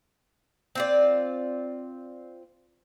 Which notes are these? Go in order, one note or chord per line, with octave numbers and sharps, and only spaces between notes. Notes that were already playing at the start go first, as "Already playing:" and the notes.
C4 F4 D5